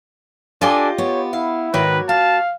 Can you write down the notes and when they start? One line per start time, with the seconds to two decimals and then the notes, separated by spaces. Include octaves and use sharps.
0.61 D4 F4 G4 A4 D#5 G#5
0.98 B3 C#5
1.33 E4 F5
1.74 G#2 D#3 A#3 F#4 B4 C#5
2.09 F4 F5 A5